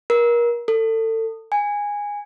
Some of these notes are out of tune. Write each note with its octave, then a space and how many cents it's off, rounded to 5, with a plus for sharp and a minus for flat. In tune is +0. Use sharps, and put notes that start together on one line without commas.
A#4 +30
A4 +30
G#5 -15